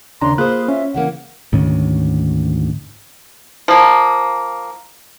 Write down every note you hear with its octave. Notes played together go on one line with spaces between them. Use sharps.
D#2 C#3 D4 A#5 C6
A#3 F4 G#4 C5 B5 F#6
C#4 E5
C#3 E3 A#3 F#5
D2 G#2 D#3 C#4
F3 A#3